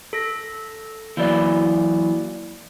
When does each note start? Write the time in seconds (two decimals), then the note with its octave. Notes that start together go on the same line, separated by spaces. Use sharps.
0.13 A4 A#6
1.17 E3 F#3 A#3 B4 D5